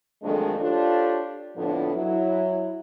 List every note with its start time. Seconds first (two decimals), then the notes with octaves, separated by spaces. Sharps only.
0.23 F2 D#3 F#3 G#3 A3 D4
0.60 D4 F4 G4 A4 C5 C#5
1.56 F2 A2 D3 F3 B3 D4
1.95 F#3 E4